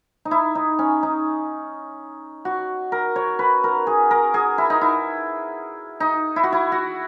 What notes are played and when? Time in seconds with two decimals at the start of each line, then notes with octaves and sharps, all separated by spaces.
0.25 D#4
0.31 E4
0.55 D#4
0.79 C#4
1.03 D#4
2.45 F#4
2.92 A#4
3.16 C#5
3.39 B4
3.64 A#4
3.87 G#4
4.11 A#4
4.34 G#4
4.58 E4
4.70 D#4
4.81 E4
6.00 D#4
6.36 E4
6.44 F#4
6.52 E4
6.72 F#4